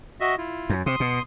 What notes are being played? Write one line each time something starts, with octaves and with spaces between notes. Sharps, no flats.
F#4 D#5 E5
E4 F4
F#2
C3 C6 D#6
B2